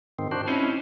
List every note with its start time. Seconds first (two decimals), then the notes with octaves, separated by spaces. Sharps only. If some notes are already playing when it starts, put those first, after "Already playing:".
0.19 G#2 D#3 C4
0.31 D4 F#4 C5
0.47 C4 C#4 D#4 E4